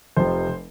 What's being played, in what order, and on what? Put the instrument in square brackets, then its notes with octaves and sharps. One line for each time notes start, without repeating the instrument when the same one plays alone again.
[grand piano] F1 F2 C3 F3 C5